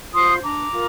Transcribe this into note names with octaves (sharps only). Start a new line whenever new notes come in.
F4 C5 C6 D#6
D4 A#5 D6
F4 A#4